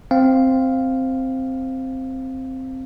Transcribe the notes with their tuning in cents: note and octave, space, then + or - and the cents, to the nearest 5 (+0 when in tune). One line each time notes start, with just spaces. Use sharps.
C4 +0 F5 +0